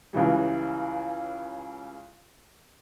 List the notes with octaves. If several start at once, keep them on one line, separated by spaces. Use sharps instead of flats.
C#2 C#3 E3 G3